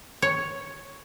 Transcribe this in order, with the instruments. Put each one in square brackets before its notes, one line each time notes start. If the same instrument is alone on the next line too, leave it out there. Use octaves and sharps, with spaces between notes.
[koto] C#5